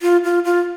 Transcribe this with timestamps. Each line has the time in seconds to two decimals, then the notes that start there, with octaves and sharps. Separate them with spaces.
0.02 F4
0.24 F4
0.45 F4